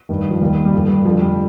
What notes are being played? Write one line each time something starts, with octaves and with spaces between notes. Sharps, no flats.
G2 D#3
F3
D#2 D#3 G3
G3
G2 D3 F3
G3
F2 D3 F3
G3